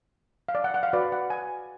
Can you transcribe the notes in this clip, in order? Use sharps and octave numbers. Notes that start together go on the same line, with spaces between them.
F5
D5
F#5
F#5
F5
F#4 B4 D5
F#5
G#5